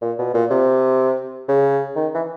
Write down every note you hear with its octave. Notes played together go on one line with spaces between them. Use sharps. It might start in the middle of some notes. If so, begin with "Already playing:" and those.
A#2
B2
A#2
C3
C#3
D#3
E3